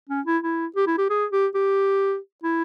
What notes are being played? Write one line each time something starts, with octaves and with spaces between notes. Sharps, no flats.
C#4
E4
E4
G4
E4
G4
G#4
G4
G4
E4